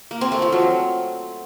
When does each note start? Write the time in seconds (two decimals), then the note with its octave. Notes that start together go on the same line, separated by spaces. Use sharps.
0.11 A#3
0.21 C4
0.32 A3
0.42 F3
0.52 F#3